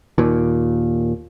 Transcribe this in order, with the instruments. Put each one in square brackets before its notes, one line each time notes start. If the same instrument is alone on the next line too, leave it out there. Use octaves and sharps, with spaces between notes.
[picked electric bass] D#2 A#2